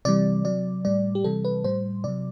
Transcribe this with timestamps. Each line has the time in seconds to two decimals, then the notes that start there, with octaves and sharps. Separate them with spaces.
0.05 C3 E3 G3 D5
0.45 C3 F#3 D5
0.85 A2 G3 D5
1.15 G4
1.24 C3 E3 G3 A4
1.45 B4
1.64 A2 G3 C5
2.04 C3 F#3 D5